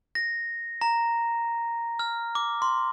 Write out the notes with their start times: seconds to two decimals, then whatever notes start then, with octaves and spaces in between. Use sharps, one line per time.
0.15 A#6
0.81 A#5
1.99 F6
2.35 D6
2.62 C6